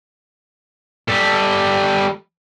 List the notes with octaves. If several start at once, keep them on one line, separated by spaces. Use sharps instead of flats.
G3 A4